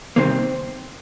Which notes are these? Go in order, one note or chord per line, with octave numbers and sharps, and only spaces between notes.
C3 D#3 G3 A#3 C4